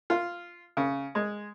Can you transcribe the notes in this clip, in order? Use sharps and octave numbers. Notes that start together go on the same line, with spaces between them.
F4
C#3
G#3